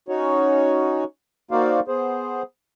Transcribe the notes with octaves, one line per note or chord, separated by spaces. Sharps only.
C#4 D#4 F#4 C#5
A#3 D#4 F#4 C5 D5 F5
B3 G#4 C5